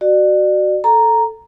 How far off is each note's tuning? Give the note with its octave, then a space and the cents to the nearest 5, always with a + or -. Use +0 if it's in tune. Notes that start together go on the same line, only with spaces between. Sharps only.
F#4 +15 D5 +35
A4 +0 A#5 +0